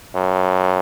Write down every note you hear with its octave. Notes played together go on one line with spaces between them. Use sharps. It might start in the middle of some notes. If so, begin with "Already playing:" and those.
F#2